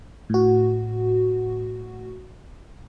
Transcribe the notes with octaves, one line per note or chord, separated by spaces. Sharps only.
A2 F#4